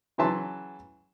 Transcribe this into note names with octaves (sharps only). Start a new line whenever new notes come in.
C#3 E3 F#3 E5 A5 C6